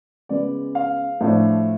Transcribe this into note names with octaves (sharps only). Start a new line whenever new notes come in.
C#3 G#3 B3 D5
F5
A2 F3 A3 D4